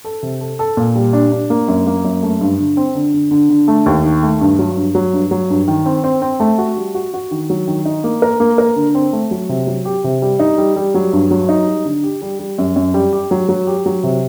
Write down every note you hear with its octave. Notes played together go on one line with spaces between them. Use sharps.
A4
C3
A4
A4
A#2
G3
D4
D4
A#3
F#2
A#3
F#2
A3
G2
D3
C4
D3
D3
D3
D3
A3
D#2
D#3
A3
G2
F#3
G2
F#3
G2
F#3
G2
D#3
C4
C4
C4
A3
F#4
G3
F#4
F#4
D#3
F#3
D#3
D#4
A#3
A#4
A#3
A#4
D3
C4
A3
F#3
C3
F#3
G4
C3
G3
D#4
G3
G3
F#3
G2
F#3
D#4
G3
D3
G4
G3
G3
F#2
F#2
G3
G4
F#3
F#3
G4
F#3
C3